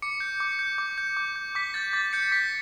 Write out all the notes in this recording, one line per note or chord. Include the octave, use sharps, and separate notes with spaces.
D6 C#7
G6
D6
G6
D6
G6
D6
G6
D6 B6
G6 A6
D6 A6
G6 C#7
D6 B6